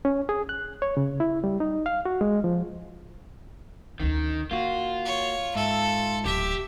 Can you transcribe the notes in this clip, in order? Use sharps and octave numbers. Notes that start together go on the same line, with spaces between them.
C#4
G#4
F#6
C#5
C#3
E4
G3
D#4
F5
F#4
G#3
F3
D2 D#3 C#4
D3 A#3 F4 F#4
C#5
G#2 A4 E5
D1 G4 E5